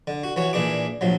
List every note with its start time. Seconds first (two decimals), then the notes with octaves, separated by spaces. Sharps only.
0.07 D3
0.24 F#4
0.36 E3 F#4 C#5
0.53 A#2 E3 D4 G#4 D6
1.01 A#1 F3 F#3